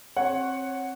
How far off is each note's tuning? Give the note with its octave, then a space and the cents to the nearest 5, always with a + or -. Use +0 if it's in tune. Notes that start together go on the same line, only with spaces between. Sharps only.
C4 +25 C#5 +0 F#5 +0